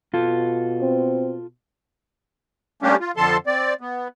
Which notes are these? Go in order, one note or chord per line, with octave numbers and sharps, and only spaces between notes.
B2 F4 A4
C4
G3 A3 A#3 C#4 D4 G4
F4
F2 D3 F3 A4 A5 C6
C4 D5
B3